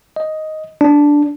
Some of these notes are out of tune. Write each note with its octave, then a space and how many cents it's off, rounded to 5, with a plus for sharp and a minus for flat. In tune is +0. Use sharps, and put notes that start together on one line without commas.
D#5 +5
D4 -5